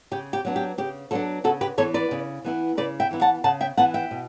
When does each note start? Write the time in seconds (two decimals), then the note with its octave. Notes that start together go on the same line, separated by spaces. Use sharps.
0.11 C#3 G4
0.33 G4
0.45 F#3 B3 D4
0.56 G4
0.78 C#3 G4
1.11 F#3 B3 D4 F#4 A4
1.44 C#3 F#4 A4
1.61 G4 B4
1.78 E3 B3 E4 A4 C#5
1.94 B4 D5
2.11 C#3
2.44 E3 B3 E4
2.77 C#3 B4 D5
3.00 E5 G5
3.11 E3 B3 E4
3.21 F#5 A5
3.44 C#3 F#5 A5
3.61 E5 G5
3.77 E3 B3 E4 F#5 A5
3.94 E5 G5
4.11 B2